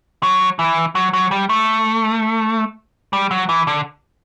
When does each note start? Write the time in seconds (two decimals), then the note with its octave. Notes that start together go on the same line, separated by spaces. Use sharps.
0.23 F#3
0.59 E3
0.95 F#3
1.13 F#3
1.31 G3
1.49 A3
3.13 G3
3.31 F#3
3.49 E3
3.67 D3